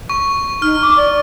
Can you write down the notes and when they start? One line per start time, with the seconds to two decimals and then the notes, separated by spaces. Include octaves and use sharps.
0.10 C#6
0.62 D#4 F6
0.82 D6
0.97 D5